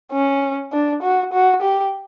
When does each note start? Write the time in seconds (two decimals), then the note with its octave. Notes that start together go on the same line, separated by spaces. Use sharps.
0.12 C#4
0.72 D4
1.02 F#4
1.33 F#4
1.62 G4